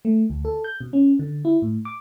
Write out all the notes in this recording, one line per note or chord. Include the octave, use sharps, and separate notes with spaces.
A3
D2
A4
G6
B2
C#4
D3
E4
A2
D6